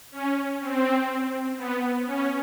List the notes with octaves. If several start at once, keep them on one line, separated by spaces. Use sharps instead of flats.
C#4
C4
B3
C#4